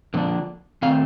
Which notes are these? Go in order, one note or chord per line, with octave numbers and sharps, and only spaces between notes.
D3 F3 A#3 D4
D#3 A3 C4 F5